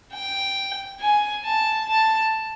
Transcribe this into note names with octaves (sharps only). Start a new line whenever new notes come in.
G5
G#5
A5
A5